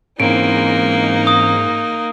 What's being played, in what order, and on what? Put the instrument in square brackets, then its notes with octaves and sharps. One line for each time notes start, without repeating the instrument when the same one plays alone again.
[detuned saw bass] G#2 [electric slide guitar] E3 C4 C#4 [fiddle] A#3 D#4 [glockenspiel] D7
[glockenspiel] D#6